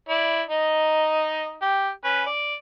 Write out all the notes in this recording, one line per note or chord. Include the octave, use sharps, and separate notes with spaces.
E4 D5
D#4 D#5
G4
C#4 B4
D5